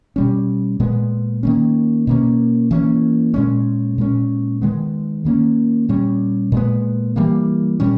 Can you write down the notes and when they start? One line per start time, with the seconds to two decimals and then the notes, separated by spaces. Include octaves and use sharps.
0.16 B2 G3 C#4
0.80 A#2 G#3 B3
1.43 D#3 A#3 C#4
2.07 B2 A#3 C#4
2.71 E3 A#3 C#4
3.34 A#2 G#3 C#4
3.98 A#2 G#3 C#4
4.62 D#3 G#3 B3
5.25 D#3 A#3 C#4
5.89 A#2 G3 C#4
6.52 A#2 G#3 B3
7.16 E3 G3 A#3
7.80 A#2 G3 C#4